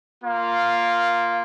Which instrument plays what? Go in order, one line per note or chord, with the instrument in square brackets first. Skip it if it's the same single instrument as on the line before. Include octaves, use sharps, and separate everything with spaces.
[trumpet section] A#3 F4